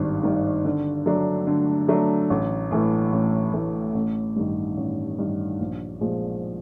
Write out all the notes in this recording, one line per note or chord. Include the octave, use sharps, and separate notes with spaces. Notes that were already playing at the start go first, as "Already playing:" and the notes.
Already playing: G#1 G2 D#3
G2 D#3
D3
F#3 A3 D4
D3
F#3 A3 D4
A1
A2 E3 A3
A1
A2 E3 A3
A1
G2 D#3
A1
G2 D#3
A#1
A#2 F3 G#3